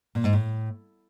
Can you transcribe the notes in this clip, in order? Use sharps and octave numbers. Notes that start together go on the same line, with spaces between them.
A#2
G#2
A2